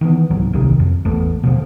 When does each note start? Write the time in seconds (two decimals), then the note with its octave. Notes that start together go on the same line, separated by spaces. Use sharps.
0.01 D#3 E3 G#3 B3
0.30 C2 G#2 F#3
0.53 A1 D#2 C3 D#3
0.80 F2
1.05 A1 E2 A3 B3
1.43 B2 D3 F3